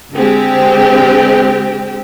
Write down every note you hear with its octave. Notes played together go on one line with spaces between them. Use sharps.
D3 G#3 C4 G4